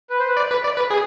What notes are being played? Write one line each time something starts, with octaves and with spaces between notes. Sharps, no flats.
B4
C5
B4
D5
B4
D5
B4
G#4